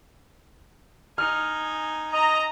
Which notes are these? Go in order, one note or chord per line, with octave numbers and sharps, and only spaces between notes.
D#4 G#5 F6
D#5 A#5